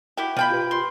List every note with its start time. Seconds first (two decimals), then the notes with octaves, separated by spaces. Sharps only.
0.17 E4 F#4 G4
0.37 B2 F3 G5 B5
0.50 F4 G4 B4
0.71 C6